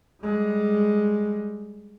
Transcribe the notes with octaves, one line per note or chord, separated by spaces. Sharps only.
G3 G#3